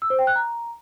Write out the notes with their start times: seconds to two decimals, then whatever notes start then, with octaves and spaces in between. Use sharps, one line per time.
0.02 E6
0.10 C5
0.19 G5
0.27 F#6
0.36 A#5